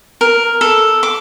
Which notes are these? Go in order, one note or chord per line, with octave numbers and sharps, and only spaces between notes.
A#4
A4
D6